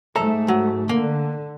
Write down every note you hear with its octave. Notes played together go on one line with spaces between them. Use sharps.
G#2 A3 A4 E5 A#5
F#3
D3 A#3